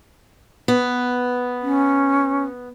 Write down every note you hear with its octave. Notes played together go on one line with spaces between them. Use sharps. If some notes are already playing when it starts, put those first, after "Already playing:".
B3
C#4